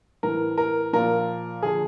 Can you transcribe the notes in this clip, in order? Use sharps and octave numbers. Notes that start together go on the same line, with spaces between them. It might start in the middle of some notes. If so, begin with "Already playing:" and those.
A2 E3 A#4
A#4
A#2 F3 A#4
D3 F3 G#4